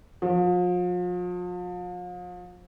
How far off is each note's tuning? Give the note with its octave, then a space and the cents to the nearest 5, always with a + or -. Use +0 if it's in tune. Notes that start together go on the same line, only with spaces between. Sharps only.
F3 +40